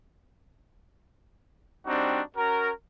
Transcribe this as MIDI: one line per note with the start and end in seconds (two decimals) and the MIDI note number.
1.87 2.22 55
1.87 2.22 60
1.87 2.22 62
1.87 2.22 63
1.87 2.22 66
2.36 2.71 61
2.36 2.71 66
2.36 2.71 70